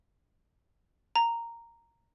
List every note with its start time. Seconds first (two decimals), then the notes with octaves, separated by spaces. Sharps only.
1.16 A#5